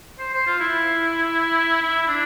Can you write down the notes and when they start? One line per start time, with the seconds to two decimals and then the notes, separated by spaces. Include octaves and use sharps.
0.19 C5
0.33 C5
0.47 F4
0.60 E4
1.82 E4
2.08 D4